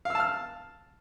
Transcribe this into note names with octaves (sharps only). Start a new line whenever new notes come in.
F5 A5 E6 F6